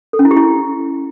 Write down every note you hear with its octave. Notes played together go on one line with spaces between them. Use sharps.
A4
C#4
E4
G4
E4